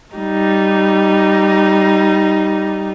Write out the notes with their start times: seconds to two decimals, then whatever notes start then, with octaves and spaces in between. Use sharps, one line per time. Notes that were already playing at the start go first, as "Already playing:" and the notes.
0.15 G3 D#4